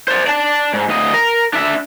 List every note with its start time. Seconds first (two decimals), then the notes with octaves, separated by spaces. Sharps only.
0.08 C5 D5
0.27 D5 A5
0.74 G#2
0.89 D2 D#5
1.14 A#4
1.54 D4 E5